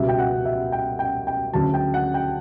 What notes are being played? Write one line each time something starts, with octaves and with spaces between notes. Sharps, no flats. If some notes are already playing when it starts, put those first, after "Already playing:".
Already playing: C#2 B2 G3 E5
G5
F#5
E5
G5
G5
G5
D2 C#3 F#3 A5
G5
F#5
G5